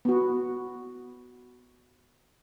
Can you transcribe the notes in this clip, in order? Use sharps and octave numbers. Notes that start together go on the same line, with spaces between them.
B3 F#4